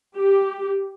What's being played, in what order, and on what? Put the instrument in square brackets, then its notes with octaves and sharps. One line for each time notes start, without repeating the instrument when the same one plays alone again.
[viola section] G4